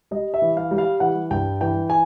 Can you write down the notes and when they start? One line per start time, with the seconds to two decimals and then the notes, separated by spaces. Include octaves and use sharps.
0.11 G3 D#5
0.34 E5
0.42 E3
0.57 F5
0.71 G3
0.78 F5
1.00 E3 F#5
1.31 G2 G5
1.61 E3 G5
1.90 G#5